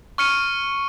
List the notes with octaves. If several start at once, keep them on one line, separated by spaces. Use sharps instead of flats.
C#6 F6 C#7 D#7